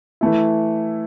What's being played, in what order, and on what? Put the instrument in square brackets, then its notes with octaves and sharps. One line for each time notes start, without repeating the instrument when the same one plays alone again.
[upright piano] E3 A3 E4